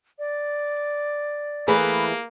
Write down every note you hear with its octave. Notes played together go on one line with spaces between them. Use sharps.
D5
E3 A3 A#3 G#4 B4 B5